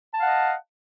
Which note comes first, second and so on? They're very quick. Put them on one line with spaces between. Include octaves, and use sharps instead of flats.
A5 F5 F#5 D#5